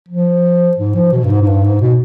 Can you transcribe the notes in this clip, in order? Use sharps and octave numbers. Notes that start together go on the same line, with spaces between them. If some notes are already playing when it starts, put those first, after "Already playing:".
F3
G#2
F3
B2
G2
G#2
G#2
G2
G#2
B2